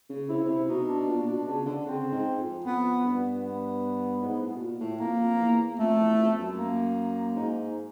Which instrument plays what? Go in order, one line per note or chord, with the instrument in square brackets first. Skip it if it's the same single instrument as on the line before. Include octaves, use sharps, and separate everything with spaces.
[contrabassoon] C#3
[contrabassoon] C3 [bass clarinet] E4
[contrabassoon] C#3
[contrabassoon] C3 [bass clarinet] E4
[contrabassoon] B2 [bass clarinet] D#4
[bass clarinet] D4
[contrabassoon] A#2
B2
C#3
D3
[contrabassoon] C#3 [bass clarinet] C4
[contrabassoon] G#2
F2
[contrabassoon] F2 [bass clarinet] B3
[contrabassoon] G2
[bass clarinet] B3
[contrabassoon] G#2
A2
B2
A#2
A2
[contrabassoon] F2 [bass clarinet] A#3
[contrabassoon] F2
E2
[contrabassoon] F2 [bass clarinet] A3
[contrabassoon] E2
F2
F#2
[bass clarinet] A#3
[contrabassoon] G#2